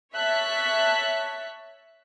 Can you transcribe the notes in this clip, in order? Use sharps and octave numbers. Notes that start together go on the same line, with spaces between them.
C#5 E5 A5 F#6 B6